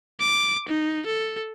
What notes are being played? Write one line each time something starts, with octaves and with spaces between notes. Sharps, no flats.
D6
D#4
A4